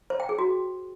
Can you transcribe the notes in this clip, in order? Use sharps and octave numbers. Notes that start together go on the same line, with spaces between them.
C5
G5
G#4
F#4